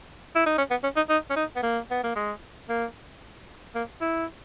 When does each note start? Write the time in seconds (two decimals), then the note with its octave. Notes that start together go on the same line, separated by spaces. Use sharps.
0.35 E4
0.46 D#4
0.58 C#4
0.70 B3
0.83 C#4
0.96 D#4
1.09 D#4
1.30 C#4
1.36 D#4
1.56 B3
1.63 A#3
1.91 B3
2.03 A#3
2.16 G#3
2.69 A#3
3.75 A#3
4.01 E4